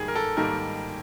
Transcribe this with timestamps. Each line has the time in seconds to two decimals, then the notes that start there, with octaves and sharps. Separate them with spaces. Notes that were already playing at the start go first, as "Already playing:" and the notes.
Already playing: G#2 D#3 G3 A#3 G#4
0.08 A#4
0.15 A4
0.37 G#2 D#3 G3 A#3 A#4